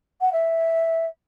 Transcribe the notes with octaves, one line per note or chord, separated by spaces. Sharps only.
F#5
E5